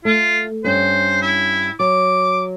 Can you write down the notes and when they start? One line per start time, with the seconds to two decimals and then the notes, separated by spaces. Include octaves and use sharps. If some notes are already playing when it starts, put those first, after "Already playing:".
0.05 A3 F4
0.64 G2 C#4 C5
1.22 E4
1.80 F#3 D6